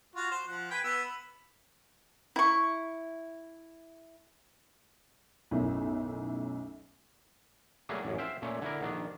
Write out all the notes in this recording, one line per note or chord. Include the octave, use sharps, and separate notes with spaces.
F4 F#4
C5
F3 F#5
B4 G5 G#5
B3 E6
B5
E4 C#6
B1 F#2 A2
F#3 G3 A3 A#3 G#4
A1 F#2
C5 E5 F5 G5
A#2 A3 C#4
D3 E4 A#4
A#1 D#3 D4